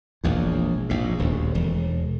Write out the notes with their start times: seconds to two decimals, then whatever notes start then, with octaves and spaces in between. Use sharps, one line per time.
0.24 E1 A#1 E2
0.89 A#1 G#2
1.19 D#1 D2
1.55 E1